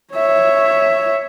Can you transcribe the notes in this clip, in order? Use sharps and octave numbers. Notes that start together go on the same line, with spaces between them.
C#5 E5